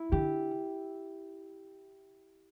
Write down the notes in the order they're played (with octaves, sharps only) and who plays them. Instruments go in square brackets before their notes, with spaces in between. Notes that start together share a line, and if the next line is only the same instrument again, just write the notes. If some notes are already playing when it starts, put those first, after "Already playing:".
Already playing: [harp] E4
[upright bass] D3 [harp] G4